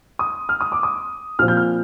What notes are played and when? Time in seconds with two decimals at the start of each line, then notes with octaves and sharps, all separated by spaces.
0.19 D#6
0.49 F6
0.61 D#6
0.72 D6
0.83 D#6
1.39 A#2 F3 C4 F6
1.48 G6
1.57 F6